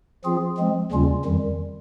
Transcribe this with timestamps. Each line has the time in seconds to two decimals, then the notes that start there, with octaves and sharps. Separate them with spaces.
0.24 F3 C4 F4 G#4
0.57 F3 G#3 C4
0.92 D#2 C#3 G3 C#4 F4
1.25 F2 D#3 G3